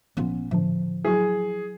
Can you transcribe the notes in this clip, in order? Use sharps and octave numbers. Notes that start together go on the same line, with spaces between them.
G#1 A#2 F3 B3 C#4
A2 D3 F3
F#3 E4 G#4